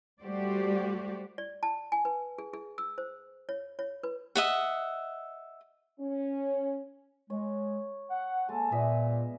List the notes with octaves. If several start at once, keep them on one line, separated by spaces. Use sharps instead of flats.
G3 A3 F#4 G4 C5 D5
D5
A5
G#5
B4
G#4
G#4
E6
C5
C#5
C#5
B4
D#5 E5 F#5
C#4
G#3 C#5
F#5
G#3 A#3 A4 A5
A#2 B3 D#5 E5